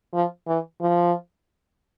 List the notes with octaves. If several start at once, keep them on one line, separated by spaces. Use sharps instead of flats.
F3
E3
F3